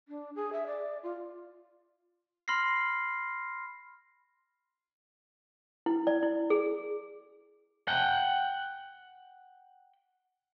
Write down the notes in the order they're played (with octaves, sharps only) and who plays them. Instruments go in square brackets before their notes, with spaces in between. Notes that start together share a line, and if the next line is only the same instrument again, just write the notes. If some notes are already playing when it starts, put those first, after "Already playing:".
[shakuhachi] D4
G#4
E5
D5
F4
[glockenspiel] B5 C6 F6 A#6 C7
[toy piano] E4
D5
E4
G#4
[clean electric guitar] F#5 G5